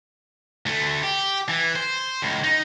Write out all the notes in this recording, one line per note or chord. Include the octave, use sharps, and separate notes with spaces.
D2 A3
G4
E3
C5
C#2 A2
D#4